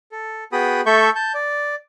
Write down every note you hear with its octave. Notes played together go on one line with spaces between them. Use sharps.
A4
B3 F#4 G#4 G5 B5 D#6
A3 A4 E5 C#6 G6
A5 G6
D5